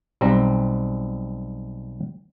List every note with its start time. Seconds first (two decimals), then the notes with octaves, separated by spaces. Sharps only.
0.21 B1 G3 C4 A#5